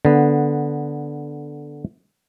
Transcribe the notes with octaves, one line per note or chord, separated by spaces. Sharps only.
D3 B3